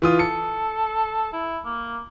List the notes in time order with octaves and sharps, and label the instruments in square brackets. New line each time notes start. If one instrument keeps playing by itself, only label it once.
[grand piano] E3 F4 D#6
[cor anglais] A4 [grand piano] C#7
[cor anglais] E4
A#3